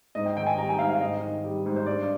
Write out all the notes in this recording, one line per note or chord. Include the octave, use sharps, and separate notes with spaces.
G#2 D#5
G5
D#3 G5
G#5
G3 A#5
G#5
G#2 F5
F5
G#2 D#5
D#3
G3
G#2
C5
G2 D5